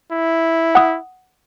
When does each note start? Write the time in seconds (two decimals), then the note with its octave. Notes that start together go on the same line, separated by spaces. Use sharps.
0.12 E4
0.75 F#5 D#6